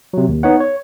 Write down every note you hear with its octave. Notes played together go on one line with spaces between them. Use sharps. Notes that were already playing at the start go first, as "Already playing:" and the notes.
C3 F#3
D#2
B3 D#4 C#5 F#5
C#5